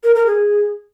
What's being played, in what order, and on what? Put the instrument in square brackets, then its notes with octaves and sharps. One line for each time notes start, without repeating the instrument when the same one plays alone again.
[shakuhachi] A#4
A#4
G#4